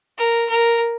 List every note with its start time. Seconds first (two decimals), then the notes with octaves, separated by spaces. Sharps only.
0.18 A#4
0.49 A#4